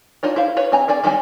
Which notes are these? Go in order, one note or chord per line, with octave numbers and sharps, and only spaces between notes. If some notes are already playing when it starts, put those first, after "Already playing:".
D4 D#4 F4 C#5
E4 C5 F5
B4 C#5
C4 G#5 A#5
C4 G#4 D5 G#5
D#3 G3 C#4 G#5